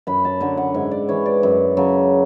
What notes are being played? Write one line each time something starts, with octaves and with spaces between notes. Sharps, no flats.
F#2 B5
A5
D3 F#3 G#5
F#5
G#2 E5
D5
E3 C#5
D5
F#2
C#3 F#3